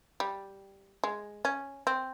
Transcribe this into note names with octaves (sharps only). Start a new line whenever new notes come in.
G3
G#3
C#4
C4